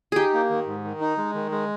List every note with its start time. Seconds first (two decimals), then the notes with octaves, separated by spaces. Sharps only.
0.12 D#4 G4 G#4
0.34 A#3
0.50 D#3
0.67 G#2
0.84 D#3
1.01 D#4
1.18 G#3
1.34 D#3
1.51 G#3